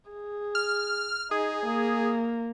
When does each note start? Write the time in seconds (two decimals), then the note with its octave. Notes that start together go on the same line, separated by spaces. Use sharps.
0.10 G#4
0.55 F6
1.31 D#4 G#4
1.66 A#3